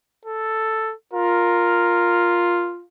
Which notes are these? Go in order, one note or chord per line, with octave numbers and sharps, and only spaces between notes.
A4
F4 A#4